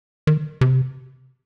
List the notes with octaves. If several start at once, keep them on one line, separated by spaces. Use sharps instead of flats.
D#3
C3